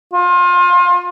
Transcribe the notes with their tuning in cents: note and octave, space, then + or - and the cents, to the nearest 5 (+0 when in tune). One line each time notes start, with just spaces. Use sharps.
F4 +30